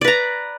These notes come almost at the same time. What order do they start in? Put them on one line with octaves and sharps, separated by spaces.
D5 B4 A#5